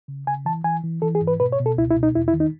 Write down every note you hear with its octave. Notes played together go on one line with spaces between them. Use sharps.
C#3
C#3 G#5
E3 A5
E3 G#5
E3
E3 A4
G#4
G#2
B4
B2 B4
C#5
B2
A4
C#2 E4
E4
B2
D#4
E2 E4
E4
D#3
D#4